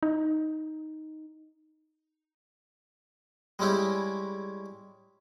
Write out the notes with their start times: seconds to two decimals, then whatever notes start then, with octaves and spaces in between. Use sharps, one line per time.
0.03 D#4
3.59 G3 G#3 C#4 E4 G4